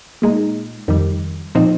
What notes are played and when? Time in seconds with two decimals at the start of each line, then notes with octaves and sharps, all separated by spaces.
0.22 A#2 G#3 D#4
0.88 F2 D#3 G3
1.55 A#2 F3 C4 D#4